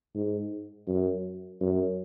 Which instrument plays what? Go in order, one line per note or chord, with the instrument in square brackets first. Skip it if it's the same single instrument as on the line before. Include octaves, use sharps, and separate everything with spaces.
[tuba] G#2
F#2
F#2